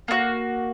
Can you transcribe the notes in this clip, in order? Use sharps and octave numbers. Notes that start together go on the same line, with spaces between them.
A#3 D4 F#4